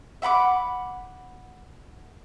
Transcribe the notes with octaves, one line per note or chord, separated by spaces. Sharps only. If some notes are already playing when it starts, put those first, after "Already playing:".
E5 F#5 B5 D6